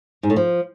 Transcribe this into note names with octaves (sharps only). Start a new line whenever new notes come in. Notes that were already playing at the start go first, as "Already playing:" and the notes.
G#2
A2
F3